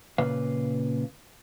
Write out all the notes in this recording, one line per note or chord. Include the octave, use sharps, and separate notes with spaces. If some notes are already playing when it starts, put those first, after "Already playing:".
A#2 C#3 B4 F5